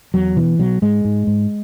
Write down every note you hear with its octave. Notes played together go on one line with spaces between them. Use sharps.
E2 F#3
B2 E3
B2 F#3
G#2 G#3
G#2
G#2